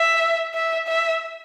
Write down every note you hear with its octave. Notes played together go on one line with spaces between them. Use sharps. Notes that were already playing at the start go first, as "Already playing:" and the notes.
Already playing: E5
E5
E5